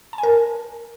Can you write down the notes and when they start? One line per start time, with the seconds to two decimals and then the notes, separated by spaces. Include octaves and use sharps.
0.13 A5
0.18 G#5
0.23 A#4